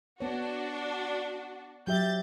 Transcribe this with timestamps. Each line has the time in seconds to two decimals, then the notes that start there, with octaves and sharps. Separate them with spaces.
0.20 B3 D4 F#4 C#5
1.87 F#3 G4 E5 G6 A6